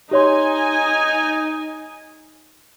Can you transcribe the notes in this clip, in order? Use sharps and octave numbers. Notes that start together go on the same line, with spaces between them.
D#4 G4 C#5 G#5 C6